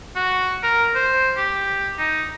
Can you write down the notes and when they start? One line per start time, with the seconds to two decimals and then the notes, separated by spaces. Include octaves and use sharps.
0.15 F#4
0.63 A#4
0.95 C5
1.36 G4
1.98 D#4